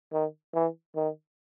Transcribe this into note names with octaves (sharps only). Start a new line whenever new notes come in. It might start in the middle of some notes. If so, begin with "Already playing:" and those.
D#3
E3
D#3